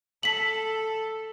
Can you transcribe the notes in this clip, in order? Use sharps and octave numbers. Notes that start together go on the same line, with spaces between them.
A4 B6 F#7